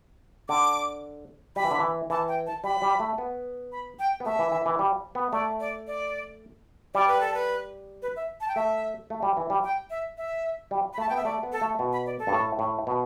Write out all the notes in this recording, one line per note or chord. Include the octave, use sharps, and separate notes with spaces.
D3 D6
G3 B5
E3
D3
E3
E3 A5
G5
A5
G3 B5
G3
A3
B3
B5
G5
B3
A3 E5
E3
E3
E3
G3
B3
A3 D5
D5
D5
G3 D5
B4
A4
B4
B4
E5
A5
G5
A3 E5
A3
G3
E3
G3
G5
E5
E5
G3
B5
A3 A5
B3 G5
E5
A3 D5
B3
A4
A3
B2
B5
D5
A4
G2
A2
A2
B2